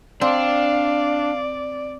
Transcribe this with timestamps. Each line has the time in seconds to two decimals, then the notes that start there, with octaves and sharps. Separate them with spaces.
0.21 C4 D4 D5 F5